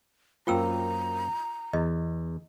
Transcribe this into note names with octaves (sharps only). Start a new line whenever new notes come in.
F#2 A#3 C4 F4 G5 A#5 E6
E2 D#5